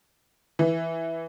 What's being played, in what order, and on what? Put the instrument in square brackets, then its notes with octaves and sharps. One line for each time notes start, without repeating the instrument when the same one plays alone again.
[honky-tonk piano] E3